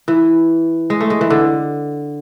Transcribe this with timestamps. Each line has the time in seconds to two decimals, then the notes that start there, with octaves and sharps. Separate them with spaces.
0.08 E3
0.90 G#3
1.01 A3
1.10 G#3
1.21 E3
1.30 D3